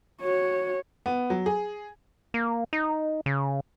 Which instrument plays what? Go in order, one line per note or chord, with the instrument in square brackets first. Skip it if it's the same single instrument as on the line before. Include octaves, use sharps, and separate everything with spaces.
[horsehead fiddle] F#4 C#5
[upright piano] B3
F#3
G#4
[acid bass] A#3
D#4
C#3